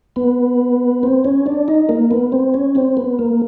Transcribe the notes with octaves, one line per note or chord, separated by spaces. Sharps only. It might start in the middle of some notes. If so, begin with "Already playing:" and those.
B3 B4
C4 C5
C#4 C#5
D4 D5
D#4 D#5
A#3 A#4
B3 B4
C4 C5
C#4 C#5
C4 C5
B3 B4
A#3 A#4